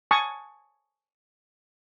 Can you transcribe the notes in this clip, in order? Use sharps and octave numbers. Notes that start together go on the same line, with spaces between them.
G#5 A5 C#6 D#6